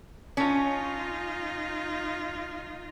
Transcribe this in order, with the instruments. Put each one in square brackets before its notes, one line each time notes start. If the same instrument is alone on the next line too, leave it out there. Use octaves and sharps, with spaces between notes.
[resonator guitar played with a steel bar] C#4 [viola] D#4 F4